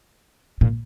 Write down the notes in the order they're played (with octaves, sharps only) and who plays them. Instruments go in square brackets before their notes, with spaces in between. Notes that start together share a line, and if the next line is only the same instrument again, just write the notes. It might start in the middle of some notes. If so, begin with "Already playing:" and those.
[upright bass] A#2